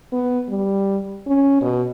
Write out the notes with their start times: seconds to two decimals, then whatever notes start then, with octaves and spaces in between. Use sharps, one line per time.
0.12 B3
0.49 G3
1.27 C#4
1.62 B2